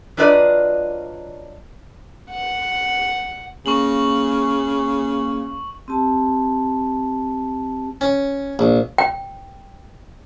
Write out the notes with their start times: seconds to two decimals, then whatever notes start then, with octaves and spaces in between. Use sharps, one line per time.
0.17 F#3 D4 F4 B4 D5 D#5
2.31 F#5
3.66 C#3 A#3 C#6 F#7
5.88 C4 G4 A5
8.01 C#4
8.59 A#1
8.98 G5